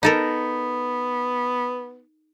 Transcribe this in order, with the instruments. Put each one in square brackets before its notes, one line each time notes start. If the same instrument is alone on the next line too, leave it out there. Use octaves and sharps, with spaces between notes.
[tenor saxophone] B3 [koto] D#4 A4 A#4